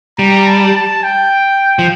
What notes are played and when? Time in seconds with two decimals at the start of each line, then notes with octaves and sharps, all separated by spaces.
0.19 G3 A#5
0.47 A5
0.75 A5
1.03 G5
1.79 F3